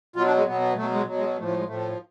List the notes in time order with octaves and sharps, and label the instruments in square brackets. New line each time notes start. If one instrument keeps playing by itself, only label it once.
[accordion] B2 F#3 F4
D4
G#3
B2 F#3 B3
B3
B2 F#3 A3
G#3
B2 F#3
G#3
A2 F3 A3
A3
G#3
A2 F3 A3